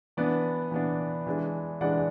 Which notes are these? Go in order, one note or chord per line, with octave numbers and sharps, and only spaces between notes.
E3 B3 D4 B4 D5
E3 B3 D4
E3 G#3 D4
E3 G#3 D4 D5 F#5